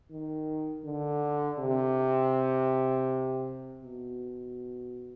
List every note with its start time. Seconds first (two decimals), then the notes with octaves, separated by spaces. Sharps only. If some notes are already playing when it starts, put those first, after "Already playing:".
0.11 D#3
0.85 D3
1.59 C3
3.83 B2